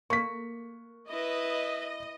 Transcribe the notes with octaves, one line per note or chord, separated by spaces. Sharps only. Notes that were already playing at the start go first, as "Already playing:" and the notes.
A#3 C#6 B6
E4 B4 D#5